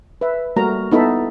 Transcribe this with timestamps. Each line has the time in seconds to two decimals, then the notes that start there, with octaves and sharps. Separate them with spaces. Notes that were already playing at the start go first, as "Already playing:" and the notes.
0.21 B4 E5
0.56 G3 A3 A#3 F#4 A#4 A#5
0.91 B3 D#4 E4 A4 E5 B5